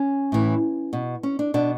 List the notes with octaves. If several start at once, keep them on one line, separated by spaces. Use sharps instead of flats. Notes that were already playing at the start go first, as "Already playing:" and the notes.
Already playing: C#4
A2 E3
B2
C#4
D4
B2 D4